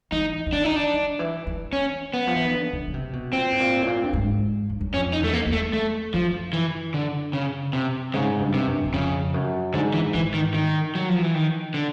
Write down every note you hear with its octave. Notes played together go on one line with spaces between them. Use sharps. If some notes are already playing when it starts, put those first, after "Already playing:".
E3 D#4
E3
D#3 D4
D#4
D4
D#3
E3
E3
C#4
B3
F3
E3
D#3
D3
C#3
C#3
C3
B2
A#2 C4
A2
A#2
A2
A#2
G2
G#2
G2
F#2
F2 C#4
D#4
E2 A3
A#3
E2
A3
A3
F#2 F3
E3
D3
C#3
C3
G#2 C#3
G2
C3
F#2
F#2
F2 C#3
F#2
G#2 D3
E3
G#2 E3
D#3
D#3
F#3
F3
E3
D#3
D3